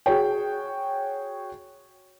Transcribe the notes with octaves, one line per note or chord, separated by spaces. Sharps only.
F#4 G#4 C#5 G5